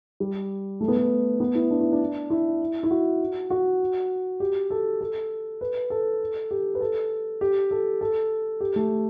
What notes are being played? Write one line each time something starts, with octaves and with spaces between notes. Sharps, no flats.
G3
A3
B3
A3
B3
E4
D4
E4
D4
E4
E4
F#4
F#4
G4
A4
A4
B4
A4
G4
B4
A4
G4
A4
A4
G4
A3